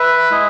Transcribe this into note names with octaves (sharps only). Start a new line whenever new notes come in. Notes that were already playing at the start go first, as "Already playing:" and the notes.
Already playing: B4 E5
G#3 E4 G#4